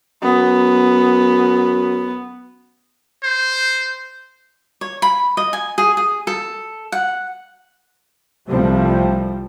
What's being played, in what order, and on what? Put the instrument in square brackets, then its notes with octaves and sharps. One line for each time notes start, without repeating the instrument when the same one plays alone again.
[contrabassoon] F#2 [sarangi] B3
[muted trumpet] C5
[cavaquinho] C#5
B5
D#5
G#5
G#4
G#4
A4
F#5
[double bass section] C2 C3 F3 G3 A3 C4